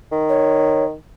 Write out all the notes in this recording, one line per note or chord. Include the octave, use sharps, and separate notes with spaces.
D#3
C#5